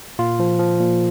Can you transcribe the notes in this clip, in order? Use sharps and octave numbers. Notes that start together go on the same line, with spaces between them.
A#2 F4
F3
F3
A#2